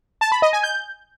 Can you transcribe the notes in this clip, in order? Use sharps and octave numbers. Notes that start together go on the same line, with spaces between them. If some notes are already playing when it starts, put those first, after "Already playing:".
A5
B5
D#5
G#5
G6